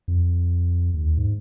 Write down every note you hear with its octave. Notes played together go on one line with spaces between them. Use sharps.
F2
D#2
G#2